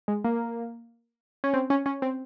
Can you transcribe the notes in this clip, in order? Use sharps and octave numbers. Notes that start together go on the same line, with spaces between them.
G#3
A#3
C#4
C4
C#4
C#4
C4